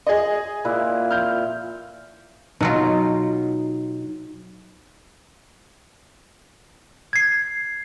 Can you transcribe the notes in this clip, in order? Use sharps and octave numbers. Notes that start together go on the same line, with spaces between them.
G#4 D#5
A#2 E4 B4
F6 G6
B2 F#3 D#4 F4
G#6 C7